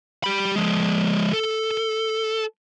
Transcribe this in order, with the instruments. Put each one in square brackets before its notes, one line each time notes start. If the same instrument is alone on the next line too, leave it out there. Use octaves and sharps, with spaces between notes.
[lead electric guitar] G4 B5
F3 G#3
A4